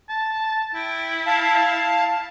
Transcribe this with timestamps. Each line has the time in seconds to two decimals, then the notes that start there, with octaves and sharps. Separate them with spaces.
0.09 A5
0.75 E4 G5
1.26 F5 A5